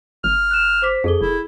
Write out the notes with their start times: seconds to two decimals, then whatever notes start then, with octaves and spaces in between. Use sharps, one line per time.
0.24 G1 F6
0.51 F#6 E7
0.82 C5 D6 B6
1.04 F2 G#4 A4 G7
1.21 F1 E4